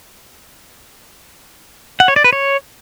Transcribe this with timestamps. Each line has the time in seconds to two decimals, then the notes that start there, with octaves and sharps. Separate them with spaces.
2.00 F#5
2.08 C#5
2.16 D5
2.24 B4
2.33 C#5